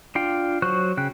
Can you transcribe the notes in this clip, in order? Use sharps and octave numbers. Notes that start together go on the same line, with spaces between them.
D4 F4 F5 G5
F#3 F#4 C5 C#6 F#6
C#3 G5 F#6